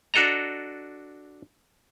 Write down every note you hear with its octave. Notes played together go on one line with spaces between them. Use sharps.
D4 F#4 A4 D#5 A#5